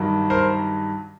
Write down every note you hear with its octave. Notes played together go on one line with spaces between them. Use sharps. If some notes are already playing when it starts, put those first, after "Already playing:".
Already playing: G2 D#3 F#3
A#4 C5